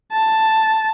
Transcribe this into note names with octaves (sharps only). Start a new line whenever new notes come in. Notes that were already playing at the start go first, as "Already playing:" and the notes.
A5